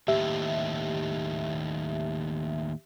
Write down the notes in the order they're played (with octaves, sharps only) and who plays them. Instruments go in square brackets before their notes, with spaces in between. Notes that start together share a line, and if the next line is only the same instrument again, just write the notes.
[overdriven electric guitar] D#2 A2 [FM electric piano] G4 E5